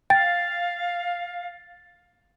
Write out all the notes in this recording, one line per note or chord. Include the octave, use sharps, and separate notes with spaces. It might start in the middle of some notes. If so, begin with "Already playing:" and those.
F5 G5 A6